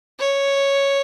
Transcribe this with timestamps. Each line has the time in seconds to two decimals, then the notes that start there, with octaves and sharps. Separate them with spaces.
0.20 C#5